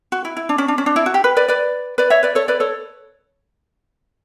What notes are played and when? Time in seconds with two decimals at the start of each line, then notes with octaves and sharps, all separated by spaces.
0.12 F#4
0.25 E4
0.37 E4
0.49 D4
0.58 C#4
0.68 D4
0.78 C#4
0.86 D4
0.96 E4
1.06 F#4
1.14 G4
1.24 B4
1.37 B4 D5
1.48 B4 D5
1.98 B4 D5
2.10 C#5 E5
2.23 B4 D5
2.35 A4 C#5
2.48 B4 D5
2.60 A4 C#5